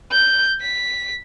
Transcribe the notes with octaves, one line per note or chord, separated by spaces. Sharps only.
G6
B6